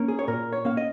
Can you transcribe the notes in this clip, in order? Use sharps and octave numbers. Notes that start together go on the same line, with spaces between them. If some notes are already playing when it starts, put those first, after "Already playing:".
Already playing: A#3 C#4
G#4
C#5
A#2 A#4
C#5
A#3 C#4 F5
D#5